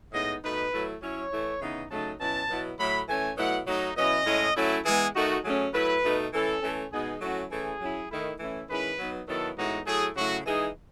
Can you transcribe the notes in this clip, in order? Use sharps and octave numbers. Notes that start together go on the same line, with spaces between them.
A2 G#3 B3 D#4 D#5
B2 A3 D#4 B4
F#3 A3 E4
F#3 C#4 E4 C#5
E3 A3 E4
C#3 E3 B3 D#4
C#3 F#3 A3 D#4 A5
B2 F#3 C#4 E4 A5
B2 F#3 B3 E4
A2 F#3 A3 B5
E3 A3 C#4 G#5
B2 F#3 A3 E4 F#5
F#3 A3 D#4
B2 F#3 C#4 E4 D#5
A2 G#3 C#4 E4
F#3 A3 C#4 E4
E3 G#3 B3 G#4
D#3 A3 D#4 F#4
F#3 A3 C#4 G#4
F#3 A3 E4 B4
B2 A3 D#4
E3 A3 C#4 E4 A4
E3 A3 C#4
B2 G#3 B3 D#4 G#4
F#3 A3 C#4 E4 F#4
E3 A3 C#4 E4 G#4
F#3 C#4 E4
D#3 A3 E4
E3 A3 C#4 E4
D#3 G#3 C#4 E4 B4
F#3 B3 D#4
D#3 F#3 B3 E4 A4
A2 E3 G#3 B3 D#4 F#4
F#3 A3 E4 G#4
C#3 F#3 A3 E4 F#4
E3 G#3 D#4 G#4